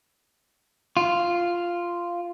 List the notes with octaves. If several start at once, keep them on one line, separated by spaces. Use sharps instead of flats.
F4